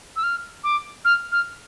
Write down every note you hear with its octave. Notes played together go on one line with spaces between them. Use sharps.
E6
F6
D6
F6
F6